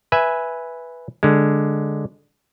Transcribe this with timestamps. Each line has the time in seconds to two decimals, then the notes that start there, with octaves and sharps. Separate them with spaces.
0.12 B4 E5 G#5
1.23 D3 G#3